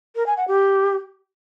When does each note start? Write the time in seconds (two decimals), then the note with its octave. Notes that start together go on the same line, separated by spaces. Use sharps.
0.16 A#4
0.26 G#5
0.37 F#5
0.48 G4